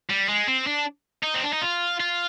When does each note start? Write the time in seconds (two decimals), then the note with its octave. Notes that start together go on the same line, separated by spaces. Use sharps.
0.10 G3
0.29 G#3
0.48 C4
0.67 D4
1.24 D#4
1.35 C4
1.43 D4
1.53 D#4
1.62 F4
2.00 F4